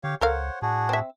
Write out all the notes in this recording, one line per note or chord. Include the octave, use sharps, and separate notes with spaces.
D3 G4 C#5 F5
C#2 A4 A#4 C5 C#5 F5 F#5
A2 D4 F#4 G#4
C4 E5